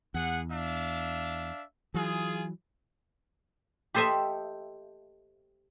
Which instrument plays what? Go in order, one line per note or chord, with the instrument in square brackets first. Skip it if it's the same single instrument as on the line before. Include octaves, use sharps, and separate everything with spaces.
[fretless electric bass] E2 [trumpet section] G#4 F#5
[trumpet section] D4 E5 F5
[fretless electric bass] E3 F#3 [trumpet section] F4 G#4
[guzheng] G4 A4 C5 D#5 E5